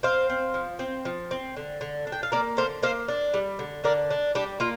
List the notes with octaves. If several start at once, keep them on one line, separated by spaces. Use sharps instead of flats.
C4 C5 F5
C4
F3
C4
F3
C4
D3
D3
D4
G5
F5
A#3 A#4 D5
D3 C5 F5
A#3 C5 F5
D4
G3
D3
D3 A#4 D5
D4
G3 D4 G4
A#3 F4